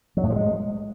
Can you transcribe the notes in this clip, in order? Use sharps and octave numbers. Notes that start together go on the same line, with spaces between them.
F#3
A2
F3
G#3